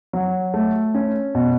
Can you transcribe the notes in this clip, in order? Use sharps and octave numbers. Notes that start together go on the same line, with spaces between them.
F#3
A3
C#4
B2